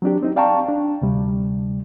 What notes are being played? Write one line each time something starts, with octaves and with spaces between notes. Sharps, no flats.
F#3 C4 D4 G4
C4 D#4
D5 F5 G5 A5 A#5 C#6
D4
D2 C3 G3